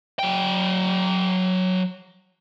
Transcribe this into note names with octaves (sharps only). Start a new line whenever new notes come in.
F#3 G5